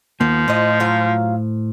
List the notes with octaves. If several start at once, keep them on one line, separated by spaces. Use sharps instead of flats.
D#2 F3 A#3 B3
A2 F4 C5 D#5
F#3 F4 F5